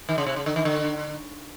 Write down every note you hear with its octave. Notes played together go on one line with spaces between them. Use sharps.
D#3
C#3
C3
C#3
D3
D#3
D3